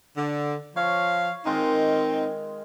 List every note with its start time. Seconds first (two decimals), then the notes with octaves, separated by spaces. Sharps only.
0.17 D3
0.76 F3 C#5 F5
1.45 D#3 G#3 C4 D#4 F4